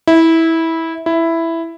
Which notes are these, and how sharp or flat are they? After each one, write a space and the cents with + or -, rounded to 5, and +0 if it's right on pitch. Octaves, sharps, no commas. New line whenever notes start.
E4 -15
E4 +5